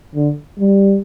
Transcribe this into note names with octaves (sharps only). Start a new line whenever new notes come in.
D3
G3